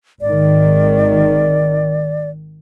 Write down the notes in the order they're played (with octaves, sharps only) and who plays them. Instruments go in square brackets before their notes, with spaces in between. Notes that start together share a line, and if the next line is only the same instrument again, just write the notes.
[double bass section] G#1 D#3 [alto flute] D5